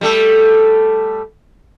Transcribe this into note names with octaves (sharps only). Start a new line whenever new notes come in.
G3 A3 A4